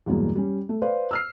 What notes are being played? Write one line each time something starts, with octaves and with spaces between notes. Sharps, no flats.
E2 G2 B2 F#3 G#3 A#3
G3 C#4
A3
B4 C5 D5 F5
E6 F6 C7